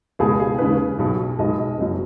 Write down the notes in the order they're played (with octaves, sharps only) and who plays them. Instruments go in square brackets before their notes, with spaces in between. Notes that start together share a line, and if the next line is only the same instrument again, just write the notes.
[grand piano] C#2 B2 G#3 G#4
G#4
D#2 C#3 G#3 B4
B1 B2 F#3
B1 B2 G#3 D#5
D#5
F#1 F#2 F#3